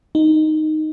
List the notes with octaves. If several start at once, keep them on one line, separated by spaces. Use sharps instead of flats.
D#4